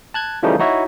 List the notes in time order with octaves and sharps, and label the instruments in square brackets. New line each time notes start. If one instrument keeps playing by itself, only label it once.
[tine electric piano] A5 F#6 G#6
C#3 E3 F3 G3 A3 D#4
D#4 E4 F#4 C#5 E5